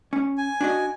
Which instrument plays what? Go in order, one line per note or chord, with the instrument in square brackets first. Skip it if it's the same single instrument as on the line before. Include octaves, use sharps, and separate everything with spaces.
[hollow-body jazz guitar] C#4
[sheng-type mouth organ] G#5
[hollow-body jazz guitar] D4 F#4 D#5